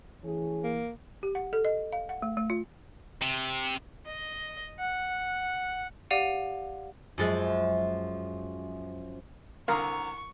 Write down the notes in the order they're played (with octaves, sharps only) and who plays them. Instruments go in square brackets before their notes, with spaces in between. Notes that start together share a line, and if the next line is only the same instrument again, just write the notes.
[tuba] E3 [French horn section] A3 C#4 G#4
[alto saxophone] A#3
[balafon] G4
F#5
A4
D#5
F5
F#5
A3
A3
F4
[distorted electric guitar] C3
[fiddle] D#5
F#5
[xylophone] G4 D5 F5 F#5 D#7
[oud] F#2 F3 G#3
[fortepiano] C2 D3 D#6 [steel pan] A#4 F5 [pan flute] A#5 [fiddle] C#6